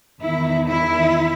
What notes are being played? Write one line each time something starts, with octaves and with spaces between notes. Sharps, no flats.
E2 D#3 E4
E4